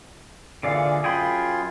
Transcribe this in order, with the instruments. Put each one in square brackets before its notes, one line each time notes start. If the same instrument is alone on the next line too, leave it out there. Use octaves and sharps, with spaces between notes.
[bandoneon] A#2 E3 G#4 [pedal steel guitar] D3 D5 F5
[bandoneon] F#2 F4 C6 [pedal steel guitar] G#4 G5 B5